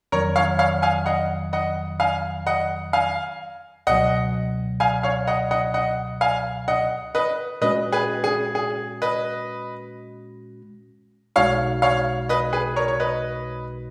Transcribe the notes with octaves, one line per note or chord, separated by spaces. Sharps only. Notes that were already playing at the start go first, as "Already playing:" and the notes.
F2 D#3 F#3 A#4 C#5
C#5 F5
C#5 F5
F5 G#5
D#5 F#5
D#5 F#5
F5 G#5
D#5 F#5
F5 G#5
C#2 B2 F#3 D#5 F#5
F5 G#5
C#5 F5
D#5 F#5
D#5 F#5
D#5 F#5
F5 G#5
D#5 F#5
B4 D#5
A#2 G#3 C#4 F#4 B4 D#5
G#4 B4
G#4
G#4
B4 D#5
B1 B2 G#3 D#4 F#4 C#5 F5
C#5 F5
B4 D#5
G#4 B4
A#4 C#5
C#5
B4 D#5